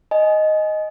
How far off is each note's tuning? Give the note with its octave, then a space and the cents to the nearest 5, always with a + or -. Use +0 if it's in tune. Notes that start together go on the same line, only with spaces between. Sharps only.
D#5 +0 G#5 +15